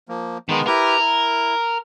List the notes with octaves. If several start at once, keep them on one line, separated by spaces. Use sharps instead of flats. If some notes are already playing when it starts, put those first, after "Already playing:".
F3 A#3
D#3 G#3 B3
E4 G4 A#4 B4
E4